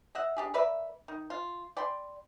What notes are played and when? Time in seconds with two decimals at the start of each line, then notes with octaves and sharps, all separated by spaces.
0.15 D#5 E5 F#5
0.37 D4 G4 G#4
0.54 A#4 B4 D5 E5
1.08 D#3
1.30 F4
1.77 D5 G5 B5 C6